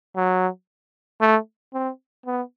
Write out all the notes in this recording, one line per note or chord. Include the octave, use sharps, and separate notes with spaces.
F#3
A3
C4
B3